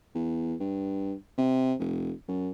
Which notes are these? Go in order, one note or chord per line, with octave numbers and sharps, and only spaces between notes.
E2
G2
C3
F1
F#2